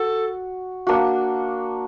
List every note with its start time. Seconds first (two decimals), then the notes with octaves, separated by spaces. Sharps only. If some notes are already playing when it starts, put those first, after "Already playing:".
Already playing: F#4 A4
0.87 A#3 D4 F#4